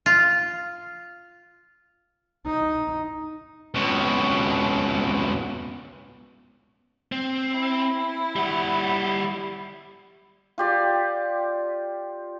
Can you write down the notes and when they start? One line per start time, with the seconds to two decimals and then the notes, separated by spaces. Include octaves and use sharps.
0.06 F4
2.46 D#4
3.74 C#2 B2
7.12 C4
7.54 E4
8.36 G3 F#5
10.58 F4 G4 D5